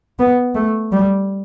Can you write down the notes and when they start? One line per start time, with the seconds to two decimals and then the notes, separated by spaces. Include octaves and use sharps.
0.19 B3
0.55 A3
0.92 G3